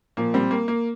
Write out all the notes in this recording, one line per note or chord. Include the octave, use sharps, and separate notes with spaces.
A#2 F3 A#3
G3 C4
A#3
A#3